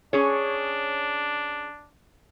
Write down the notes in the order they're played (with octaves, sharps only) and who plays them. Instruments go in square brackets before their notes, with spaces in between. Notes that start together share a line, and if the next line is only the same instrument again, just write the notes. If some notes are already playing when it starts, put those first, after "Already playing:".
[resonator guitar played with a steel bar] C#4 G#4 C#5 [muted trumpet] D4